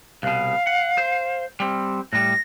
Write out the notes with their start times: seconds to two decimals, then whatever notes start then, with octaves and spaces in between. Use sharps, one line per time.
0.23 C2 B2 F5
0.67 F#5
0.98 C5
1.60 G3 C4
2.13 A2 G3 A#6